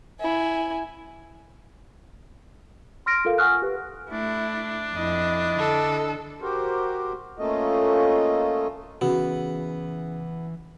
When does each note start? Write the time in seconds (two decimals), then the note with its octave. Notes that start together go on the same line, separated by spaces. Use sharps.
0.21 E4 G#5
3.06 C6 F6 A#6 D7
3.25 F4 A4 A#4 F5
3.38 F#5 G#5 C#6 D#6 F6 F#6
3.62 G4 B4
4.11 A3 D4 E4
4.94 F2 E4 D#5
5.59 D3 A4
6.42 F#4 G4 A#4 C5
7.39 A3 A#3 C#4 F4 A4 D#5
9.01 C#3 E3 B3 F#4